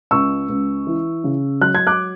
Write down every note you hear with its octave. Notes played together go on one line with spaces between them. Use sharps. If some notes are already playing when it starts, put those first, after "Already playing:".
C#2 C#6 E6
C#2
E3
C#3
F#3 F#6
G#6
D6 F#6